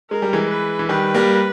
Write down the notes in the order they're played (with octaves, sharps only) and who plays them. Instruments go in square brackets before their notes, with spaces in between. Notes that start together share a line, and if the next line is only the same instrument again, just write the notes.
[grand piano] G#3 [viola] A#4
[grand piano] G3
E3 G#3
[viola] B4
[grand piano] E3
[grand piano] D#3 G3 [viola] B4
[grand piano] G3 A#3